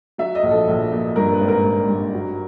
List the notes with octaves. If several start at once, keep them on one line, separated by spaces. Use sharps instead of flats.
F#3 E5
D#5
A#1
A4
A#1
A#2
G2 A#4
B4
G#1
A#4
G2
G2
F#3